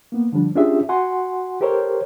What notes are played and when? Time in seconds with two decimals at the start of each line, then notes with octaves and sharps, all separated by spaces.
0.12 A#3 B3
0.32 D3 F3 G3 D4
0.55 C#4 D4 F4 G4 G#4 E5
0.89 F#4 F#5 G#5 C6
1.61 G4 A4 A#4 C5 C#5